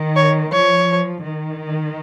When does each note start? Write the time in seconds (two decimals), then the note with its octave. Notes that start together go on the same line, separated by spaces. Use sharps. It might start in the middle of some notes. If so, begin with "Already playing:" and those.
Already playing: D#3
0.16 C#5
0.52 F3 C#5
1.24 D#3